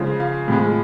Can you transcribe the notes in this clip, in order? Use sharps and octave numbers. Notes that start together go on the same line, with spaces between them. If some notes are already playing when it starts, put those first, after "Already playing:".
Already playing: C#3 F3 G#3
F5
A2 F3 G#3